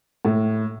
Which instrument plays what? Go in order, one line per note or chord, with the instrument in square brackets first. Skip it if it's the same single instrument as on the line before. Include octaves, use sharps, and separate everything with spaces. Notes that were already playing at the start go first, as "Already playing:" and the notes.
[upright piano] A2